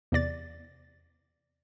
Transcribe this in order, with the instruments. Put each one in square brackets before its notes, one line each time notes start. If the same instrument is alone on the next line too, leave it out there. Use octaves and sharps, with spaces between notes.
[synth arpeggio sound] E2 C3 D5 A6